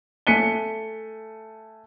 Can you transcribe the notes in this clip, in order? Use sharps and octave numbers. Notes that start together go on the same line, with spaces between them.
A3 G#5 B6 C#7 D#7 G7